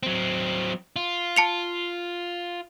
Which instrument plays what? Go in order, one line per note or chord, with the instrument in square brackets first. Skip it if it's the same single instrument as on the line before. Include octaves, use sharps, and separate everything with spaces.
[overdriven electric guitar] F#3 C4
F4
[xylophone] A5 C#7 F7